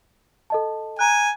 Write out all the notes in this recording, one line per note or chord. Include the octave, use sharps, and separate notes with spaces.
A4 D#5 A5
G#5 A#5 F#6